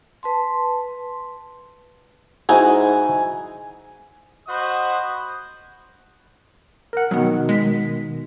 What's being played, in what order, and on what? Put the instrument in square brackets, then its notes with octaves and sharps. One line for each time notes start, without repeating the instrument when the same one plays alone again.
[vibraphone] B4 A5 C6
[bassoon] G#2 [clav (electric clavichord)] D#4 E4 F#4 [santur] G#5
[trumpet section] F#4 C5 D#5 B5 D#6
[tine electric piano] A#4 F#5
[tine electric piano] B2 D#3 [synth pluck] F#3 B3
[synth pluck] G#3 B6